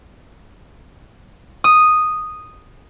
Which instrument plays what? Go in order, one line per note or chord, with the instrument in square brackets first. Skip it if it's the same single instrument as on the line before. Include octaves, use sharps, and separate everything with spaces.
[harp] D#6